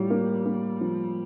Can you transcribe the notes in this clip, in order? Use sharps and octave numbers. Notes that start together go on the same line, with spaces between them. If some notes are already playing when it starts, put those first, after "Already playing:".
Already playing: A2 G3 F4
A#3
A#3
F3